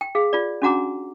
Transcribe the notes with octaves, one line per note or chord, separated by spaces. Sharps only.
G5
G#4 F5
F4 D5
C#4 D4 F#4 F#5 A#5 D6